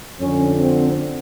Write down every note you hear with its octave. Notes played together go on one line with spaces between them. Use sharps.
F2 D3 C#4
C4